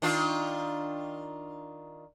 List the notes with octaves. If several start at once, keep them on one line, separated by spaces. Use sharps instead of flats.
D#3 D4 F4